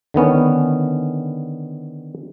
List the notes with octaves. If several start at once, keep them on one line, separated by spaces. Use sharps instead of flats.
D3 D#3 B3 C#4